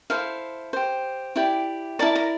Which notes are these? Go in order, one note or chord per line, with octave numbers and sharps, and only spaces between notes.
E4 A4 C5 F5
G4 C5
E4 G4 D5 G5
E4 A#4 D5 A5
A#5